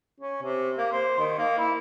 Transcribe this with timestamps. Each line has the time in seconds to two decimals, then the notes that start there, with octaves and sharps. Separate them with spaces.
0.20 C#4
0.43 C3
0.78 A#3
0.92 C5
1.19 D#3
1.38 A#3
1.58 E4